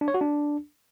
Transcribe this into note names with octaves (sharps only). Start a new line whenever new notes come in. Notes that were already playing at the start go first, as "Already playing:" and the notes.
D4
C#5
F#4
D4